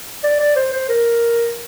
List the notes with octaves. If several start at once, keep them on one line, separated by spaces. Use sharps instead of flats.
D5
D5
C5
C5
A#4